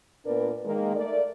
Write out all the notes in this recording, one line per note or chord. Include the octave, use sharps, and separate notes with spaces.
A#2 B3 D4 A#4 B4 D5
D#3 G#3 A#3
A3 A#4 D5